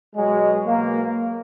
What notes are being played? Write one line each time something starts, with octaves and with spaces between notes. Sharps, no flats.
B2 F#3 G#3
B2 F#3 A#3